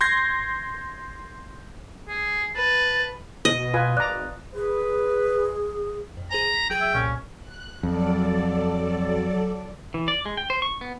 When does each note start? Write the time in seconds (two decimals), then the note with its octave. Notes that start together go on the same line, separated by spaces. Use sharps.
0.01 C6 G6 G#6 A#6 C7
2.09 G#4
2.56 B4 A5
3.45 B2 D#5
3.74 F4 B4 G#5
3.97 G#1 D5 A#5 F#6
4.54 G#4 B4
6.17 F2
6.30 G#4 C5 G#5 A#5
6.52 B6
6.70 F#3 G#4 G5 G#6
6.81 E5
6.95 C2 F2 A#2 C#4
7.41 F#6
7.83 F2 F#3 A4 D5
9.94 E3
10.08 D5
10.26 G#3
10.37 G5
10.50 C5
10.62 C#6
10.81 B3